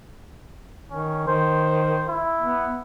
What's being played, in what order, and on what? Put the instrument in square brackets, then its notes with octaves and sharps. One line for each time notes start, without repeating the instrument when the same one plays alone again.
[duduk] D#3 [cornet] C#4
[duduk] D#3 [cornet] C5
[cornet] E4
[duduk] B3